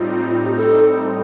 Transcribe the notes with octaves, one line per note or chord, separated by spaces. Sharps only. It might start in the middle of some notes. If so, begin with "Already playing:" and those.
Already playing: A2 G3 C4 D#4 F4
G4
A4